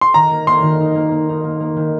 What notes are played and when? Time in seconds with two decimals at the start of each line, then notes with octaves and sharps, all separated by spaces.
0.01 C6
0.14 D#3 A#5
0.31 A#3
0.47 A#3 C6
0.63 D#3
0.80 D#4
0.95 A#3
1.11 A#3
1.29 D#4
1.44 A#3
1.60 A#3
1.76 D#3